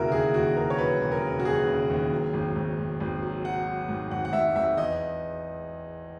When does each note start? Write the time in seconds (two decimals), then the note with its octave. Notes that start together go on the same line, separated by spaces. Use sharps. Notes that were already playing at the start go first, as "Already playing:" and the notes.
Already playing: E1 D#2 C#3 E4 F#4 A#4
0.12 D#2 G#4
0.34 D#2 F#4
0.56 C#3 A#4
0.70 C#5
0.78 F#3 B4
1.00 E1
1.12 A#4
1.23 C#3
1.39 F#4
1.45 D#2 G#4
1.67 C#3
1.89 D#2
2.12 F#3
2.33 G#1
2.56 G#1
2.78 G#1
3.00 G#1
3.22 F#3
3.44 F#3 F#5
3.67 F#3
3.89 G#2
4.11 G#1 F#5
4.25 F#5
4.33 G#2 E5
4.56 G#1 E5
4.77 E2 D#5